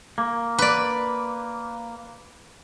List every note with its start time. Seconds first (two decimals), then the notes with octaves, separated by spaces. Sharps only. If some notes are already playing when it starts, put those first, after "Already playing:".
0.18 A#3
0.58 B4 D5